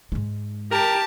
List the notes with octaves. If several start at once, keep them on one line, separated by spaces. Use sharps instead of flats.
G#2 G#3
G4 A#4 A5